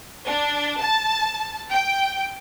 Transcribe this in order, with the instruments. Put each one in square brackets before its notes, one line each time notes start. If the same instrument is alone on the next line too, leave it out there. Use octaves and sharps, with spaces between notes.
[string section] D4
A5
G5